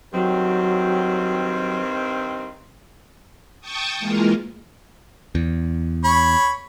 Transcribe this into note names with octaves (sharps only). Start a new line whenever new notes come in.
G2 D#3 F#3 C4
G5 A5 C#6 D#6
E3 G#3 A#3 F4 A#4
E2
C#5 B5 C#6